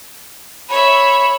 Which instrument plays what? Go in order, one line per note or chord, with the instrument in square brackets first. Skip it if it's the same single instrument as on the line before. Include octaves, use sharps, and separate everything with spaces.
[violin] C#5 E5 [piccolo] B5